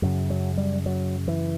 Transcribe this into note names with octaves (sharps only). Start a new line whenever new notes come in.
F#2 C#3 F#3
F#3
G3
F#3
E3